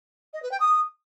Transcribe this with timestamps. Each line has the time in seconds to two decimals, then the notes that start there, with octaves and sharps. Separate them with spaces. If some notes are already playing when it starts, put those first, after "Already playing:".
0.33 D#5
0.42 B4
0.51 G5
0.60 D#6